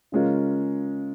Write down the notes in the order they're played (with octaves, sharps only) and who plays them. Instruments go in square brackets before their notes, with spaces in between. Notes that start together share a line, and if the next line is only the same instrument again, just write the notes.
[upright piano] C#3 G#3 C#4 F4 A#4